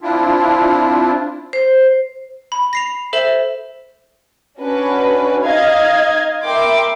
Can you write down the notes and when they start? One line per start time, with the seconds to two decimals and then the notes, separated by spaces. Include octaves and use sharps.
0.01 C4 D4 E4 F4
1.53 C5
2.52 B5
2.73 A#6 C7 F7
3.13 A4 C5 E5 E7 F#7
4.60 C#4 D4 F#4 B4
5.44 D#4 D#5 F5 G#6
6.43 A#4 E5 G5 B5 C6 D6